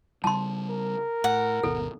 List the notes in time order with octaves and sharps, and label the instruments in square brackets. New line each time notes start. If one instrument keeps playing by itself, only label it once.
[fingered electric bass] C#3 G3 [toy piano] A5 C6
[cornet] A#4
[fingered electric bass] A2 [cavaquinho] F#5
[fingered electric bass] G#1 D#2 B2 [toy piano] A4